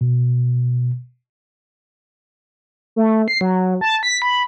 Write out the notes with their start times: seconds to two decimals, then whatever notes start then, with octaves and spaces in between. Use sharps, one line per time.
0.01 B2
2.96 A3
3.28 C7
3.41 F#3
3.81 A5
4.03 B6
4.22 B5